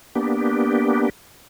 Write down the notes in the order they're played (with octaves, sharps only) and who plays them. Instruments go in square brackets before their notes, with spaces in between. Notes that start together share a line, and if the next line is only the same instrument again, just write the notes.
[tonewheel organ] A#3 B3 D4 G4